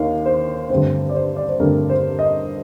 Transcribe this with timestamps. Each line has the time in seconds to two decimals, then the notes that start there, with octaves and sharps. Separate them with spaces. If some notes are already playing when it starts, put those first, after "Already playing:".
Already playing: D#2 D#3 A#3 F5
0.26 C5
0.70 G2 D3 A3 C4 C5
1.09 D5
1.15 C5
1.37 D5
1.49 C5
1.60 G2 D3 A3 C4 A#4
1.90 C5
2.19 D#5